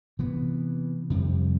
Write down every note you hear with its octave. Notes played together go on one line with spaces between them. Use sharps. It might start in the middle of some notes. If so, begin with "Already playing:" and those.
C3 E3 B3
F2 C3 G3